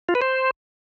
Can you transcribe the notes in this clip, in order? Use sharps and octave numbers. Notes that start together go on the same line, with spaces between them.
F4
B4
C5